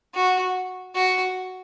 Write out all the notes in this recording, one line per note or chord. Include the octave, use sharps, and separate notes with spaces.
F#4
F#4